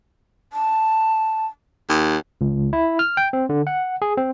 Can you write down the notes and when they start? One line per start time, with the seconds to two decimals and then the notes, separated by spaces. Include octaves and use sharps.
0.53 A5
1.89 D#2
2.41 C#2
2.73 E4
2.99 F6
3.17 G5
3.33 C4
3.49 D3
3.67 F#5
4.02 G#4
4.17 C4